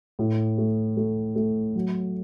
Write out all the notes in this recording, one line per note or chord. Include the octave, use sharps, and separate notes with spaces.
A2
A3
A3
A3
F#3